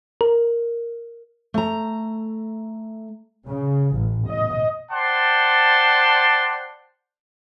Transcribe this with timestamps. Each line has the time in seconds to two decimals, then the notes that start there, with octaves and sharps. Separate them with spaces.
0.21 A#4
1.54 A3 A#5
3.46 C#3
3.96 A1
4.27 D#5
4.91 C5 D5 F#5 G5 A5 C6